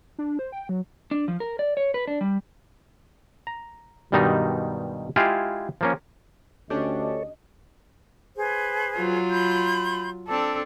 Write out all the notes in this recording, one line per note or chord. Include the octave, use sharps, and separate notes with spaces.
D4
C5
G5
F#3
D4
F3
A#4
D5
C#5
B4
D4
G3
A#5
G2 B2 D#3 G3 G#3 D#4
G#3 E4 F4 G4 G#4 F5
F3 A#3 C#4
D2 C#4 D4 G4 A4 C#5 D#5
G#4 B4 C5
F#3 F4
B5 C6 G6
C4 D4 A4 A5